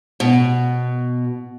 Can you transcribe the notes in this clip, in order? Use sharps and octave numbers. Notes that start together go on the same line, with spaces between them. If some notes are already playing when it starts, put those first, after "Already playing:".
B2